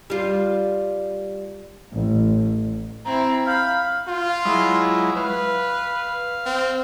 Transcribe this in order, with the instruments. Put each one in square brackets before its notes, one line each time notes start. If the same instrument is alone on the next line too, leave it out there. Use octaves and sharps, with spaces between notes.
[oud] G3 F4
[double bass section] A1
[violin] C4 E4 [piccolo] A#5
[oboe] F5 [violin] B5 [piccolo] G6
[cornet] F4
[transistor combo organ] F#3 G#3 E4
[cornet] B4 [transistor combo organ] F5
[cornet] C4